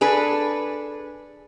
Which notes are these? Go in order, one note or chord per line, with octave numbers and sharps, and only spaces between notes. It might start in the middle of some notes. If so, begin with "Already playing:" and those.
D4 G#4 A4 B4